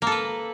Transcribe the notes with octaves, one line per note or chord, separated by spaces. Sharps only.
A#3 A4 B4